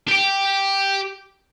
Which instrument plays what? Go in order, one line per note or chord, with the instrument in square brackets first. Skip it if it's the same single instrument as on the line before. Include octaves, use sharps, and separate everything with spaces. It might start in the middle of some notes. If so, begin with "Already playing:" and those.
[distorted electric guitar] G4 G5